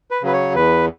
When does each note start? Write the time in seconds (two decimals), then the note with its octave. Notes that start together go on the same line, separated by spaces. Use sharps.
0.11 B4
0.22 C#3 F#3 B4
0.33 C#5
0.55 E2 B4